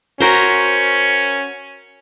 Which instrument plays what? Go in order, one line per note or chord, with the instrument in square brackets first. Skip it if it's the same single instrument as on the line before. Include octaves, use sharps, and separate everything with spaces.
[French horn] C#4 [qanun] F#4 A#4 C5